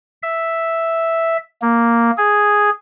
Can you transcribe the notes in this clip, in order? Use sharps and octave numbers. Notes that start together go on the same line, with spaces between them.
E5
A#3
G#4